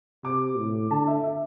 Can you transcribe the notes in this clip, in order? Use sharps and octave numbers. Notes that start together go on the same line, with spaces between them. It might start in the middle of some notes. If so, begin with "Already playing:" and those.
C3 D6
A2
D3 A5
E5
E5